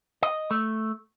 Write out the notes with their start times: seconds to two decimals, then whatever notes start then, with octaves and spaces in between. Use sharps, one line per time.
0.23 D#5
0.51 A3